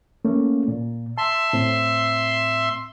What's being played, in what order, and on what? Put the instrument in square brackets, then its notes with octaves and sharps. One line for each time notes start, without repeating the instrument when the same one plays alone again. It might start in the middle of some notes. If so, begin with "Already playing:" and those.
[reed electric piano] A3 A#3 C#4
A#2
[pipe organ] E5 C6 [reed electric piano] A5
[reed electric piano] A2 C4